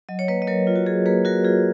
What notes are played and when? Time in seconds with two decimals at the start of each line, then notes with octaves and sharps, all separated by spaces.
0.09 F#3 D#5
0.19 C#5
0.28 A#3 B4 D#5
0.42 D#5
0.47 F#3 A#4 C#5
0.67 F4
0.76 F#4
0.86 F#3 G#4
1.06 A#3 G#4 B4
1.25 F#3 F#4 A#4
1.44 F4 G#4